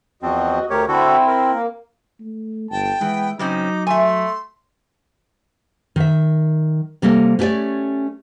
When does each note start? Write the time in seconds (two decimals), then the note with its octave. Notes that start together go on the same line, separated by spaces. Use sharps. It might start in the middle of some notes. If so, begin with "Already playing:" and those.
0.23 E2 F3 C4 F#4 D#5
0.70 D2 G4 A#4 C#5
0.88 D3 C4 E4 F#4 A4
1.28 A#4
1.52 A#3
2.20 A3
2.71 G1 G5 A5
3.01 E3 G#3 B3
3.39 C#3 F#3 C4 C#4 D#4 D6
3.87 A3 E5 G#5 C6
5.96 D#3 E5
7.02 C3 G3 A#3 A4
7.39 A3 C#4 G4 A4 C#5 D5